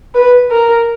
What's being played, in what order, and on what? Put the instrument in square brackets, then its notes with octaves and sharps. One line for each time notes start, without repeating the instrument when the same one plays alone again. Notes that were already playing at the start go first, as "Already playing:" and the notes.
[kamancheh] B4
A#4